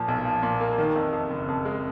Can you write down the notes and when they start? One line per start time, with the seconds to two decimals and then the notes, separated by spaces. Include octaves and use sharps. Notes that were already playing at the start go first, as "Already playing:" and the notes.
Already playing: A#2 F3
0.08 B1
0.25 F3
0.43 A#2
0.60 A#3
0.78 D#3
0.96 F2
1.13 F2
1.30 F#1
1.48 F2
1.65 G#3